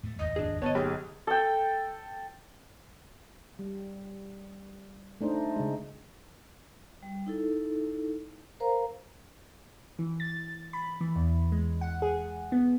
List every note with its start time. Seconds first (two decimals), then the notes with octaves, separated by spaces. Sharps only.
0.03 A2 A3
0.19 D#1 G#1 F2 D#5
0.36 D4 G#4
0.62 G1 B3 C#5 D#5 A5
0.75 B1 G4 G#4
1.27 A4 G5
3.59 G3
5.21 A3 D4 D#4 C5 D#5
5.56 C#3 G#3
7.03 G3
7.26 D#4 E4 A4
8.60 A#4 C5 F5 A#5
9.99 E3
10.20 A6
10.73 B5
11.01 E3
11.16 E2
11.52 G#3
11.81 F#5
12.02 G#4
12.52 B3